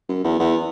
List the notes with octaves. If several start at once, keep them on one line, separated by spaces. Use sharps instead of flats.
F#2
E2
E2